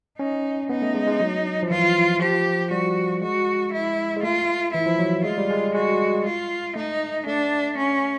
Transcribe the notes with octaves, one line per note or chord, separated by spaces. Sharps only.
C#4 D#4
B3 D#4
A3
G#3
G#3
F#3
F3
E3 F4
F3 G4
G3 F#4
G#3 F#4
E4
G#3
A3 F4
E3 E4
F3
F#3
G#3 F4
G3
G#3
G#3 F#4
F4
A3 D#4
A3 D4
C#4